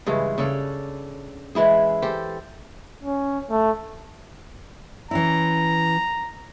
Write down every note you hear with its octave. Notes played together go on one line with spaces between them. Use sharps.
G2 C#3 E3 G#3
C#3 D4 A4 C#5
E3 G#3 E4 G#4
G4 A4 C5
C#4
A3
E3 C#4 E4 A#5